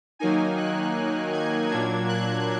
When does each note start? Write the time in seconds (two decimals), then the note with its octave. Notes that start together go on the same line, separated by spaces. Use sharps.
0.19 D#3 F#3 A#3 D#4 G#5
0.58 F#6
1.33 G#6
1.70 A#2 F#3 A#3 D4 G#6
2.08 F#6